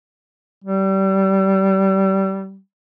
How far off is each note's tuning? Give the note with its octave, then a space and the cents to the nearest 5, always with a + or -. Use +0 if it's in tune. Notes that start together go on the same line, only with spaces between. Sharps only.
G3 -25